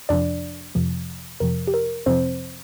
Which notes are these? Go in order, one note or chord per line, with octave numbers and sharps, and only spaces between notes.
F2 C3 F3 D4 D5
F2 C3 F3
F2 C3 F3 A#4
G4
A#4
F2 C3 F3 C4 C5